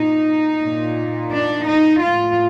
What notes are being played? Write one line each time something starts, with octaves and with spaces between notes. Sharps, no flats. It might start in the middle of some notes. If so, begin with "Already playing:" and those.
Already playing: A#2 D#4
A#2
D4
D#4
A2 F4